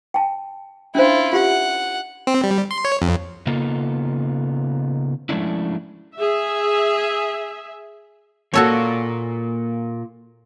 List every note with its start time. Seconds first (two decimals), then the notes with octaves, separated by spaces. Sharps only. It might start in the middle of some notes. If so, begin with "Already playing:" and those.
0.14 G5 A5
0.95 C#4 D4 E4 F4 C5
1.33 F4 G4 E5 F#5
2.27 C4
2.44 G3
2.71 C6
2.85 C#5
3.02 F2
3.46 C#3 A#3 B3 D#4 F4 A4
5.29 F3 G#3 A3 C#4 D4 E4
6.15 G#4 E5
8.54 A#2 A#3 F#4 A4 C#5